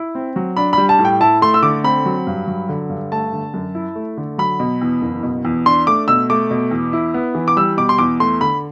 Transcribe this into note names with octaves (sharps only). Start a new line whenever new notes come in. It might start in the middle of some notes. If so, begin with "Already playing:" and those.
Already playing: E4
C4
F#3
D4 B5
G3 B5
A5
A2
G5
E4 A5
A3 C6
E6
D3 D6
C4 B5
F#3
G2
F#3
D3
G2
A3 A5
D3
F#2
E4
A3
D3
F#3 B5
B2
E2
F#1
B2
E2
D4 C6
A3 D6
B2 E6
A3 D6
B2
E2
E4
B3
E3
D6
G3 E6
B2 D6
C6
E2 D6
A3 C6
D3 B5